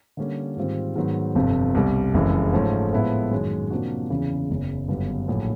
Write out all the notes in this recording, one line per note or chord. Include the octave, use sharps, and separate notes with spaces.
D3 G3 A#3 C#4
G#2 D#3 G3 C4 F4
G#2 D#3 F#3 B3
G1 F2 C3
C2 B2 G3
F#1 F2 C#3 E3 G#3
G#2 F3 A3 C#4
A2 F3 G#3 B3 E4
F#2 D#3 G#3 C#4
C3 F3 A#3 D4 F#4
E2 C#3 E3
F#1 E2 C#3
G1 F#2 D3 G3 B3
A#1 A2 F#3